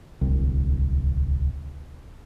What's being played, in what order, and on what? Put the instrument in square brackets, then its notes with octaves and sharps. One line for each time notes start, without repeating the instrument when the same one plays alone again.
[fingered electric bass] D1 C2